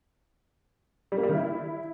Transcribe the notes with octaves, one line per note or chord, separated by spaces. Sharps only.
G3
A#3
G3
D#3
E4